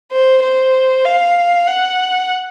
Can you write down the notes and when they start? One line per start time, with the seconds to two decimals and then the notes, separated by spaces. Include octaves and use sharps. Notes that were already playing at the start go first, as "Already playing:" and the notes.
0.12 C5
0.43 C5
1.05 F5
1.67 F#5